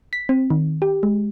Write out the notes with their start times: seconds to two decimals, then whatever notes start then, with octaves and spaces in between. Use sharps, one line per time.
0.13 B6
0.29 C4
0.50 D#3
0.82 G4
1.03 G#3